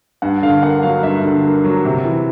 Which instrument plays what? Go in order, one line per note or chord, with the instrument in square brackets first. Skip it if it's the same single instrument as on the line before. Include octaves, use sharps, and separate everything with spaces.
[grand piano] G2 F#5
D3 F5
A#3 F#5
F#3 F5
G2 E5
D3
A#3
F#3
C3
E3